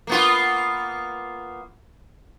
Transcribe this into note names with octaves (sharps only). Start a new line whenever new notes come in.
A#3 B3 F4